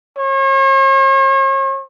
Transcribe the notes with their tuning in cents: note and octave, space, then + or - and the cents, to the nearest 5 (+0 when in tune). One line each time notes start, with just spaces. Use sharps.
C#5 -45